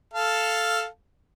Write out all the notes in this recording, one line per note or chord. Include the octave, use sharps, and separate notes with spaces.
A4 F5 A5